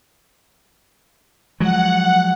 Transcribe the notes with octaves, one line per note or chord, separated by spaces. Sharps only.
F3 F#3 G#3 F#5